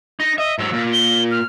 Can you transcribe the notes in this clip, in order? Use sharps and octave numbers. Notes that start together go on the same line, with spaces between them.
D#4 A#6
D#5 E5
G#2 F#3 E6
A#2
G7
F6